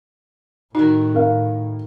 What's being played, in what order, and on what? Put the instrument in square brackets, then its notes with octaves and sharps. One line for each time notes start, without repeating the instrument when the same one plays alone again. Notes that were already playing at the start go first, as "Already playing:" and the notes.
[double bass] A2 [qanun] D#3 F#4 [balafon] D#4
[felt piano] A#4 F5